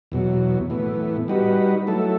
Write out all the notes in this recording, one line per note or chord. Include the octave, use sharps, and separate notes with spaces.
E2 B2 F#3
A2 E3 B3
G3 D#4 F#4 B4
F#3 A3 E4 A4